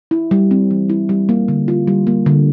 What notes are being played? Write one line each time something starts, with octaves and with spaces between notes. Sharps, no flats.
E4
G3
C4
E3
E4
G3
A#3
D3
F4
G3
A#3
D3